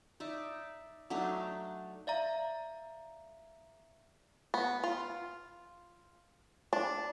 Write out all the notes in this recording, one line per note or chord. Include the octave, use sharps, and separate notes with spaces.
D#4 D5 E5
F#3 A3 D4 D#4
D5 E5 F5 A#5
B3
F4
D4